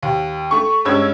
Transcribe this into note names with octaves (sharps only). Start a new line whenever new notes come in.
D#2
A3 C#6
G2 G#3 C#4 E6 G#6